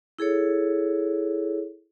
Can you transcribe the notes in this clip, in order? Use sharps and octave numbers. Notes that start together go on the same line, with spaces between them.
E4 G#4 A4 C#5